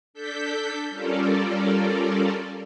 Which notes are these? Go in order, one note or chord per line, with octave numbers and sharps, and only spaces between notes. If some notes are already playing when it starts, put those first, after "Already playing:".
D4 A4 G6 B6
G3 C#4 F4 A4 A#4 D5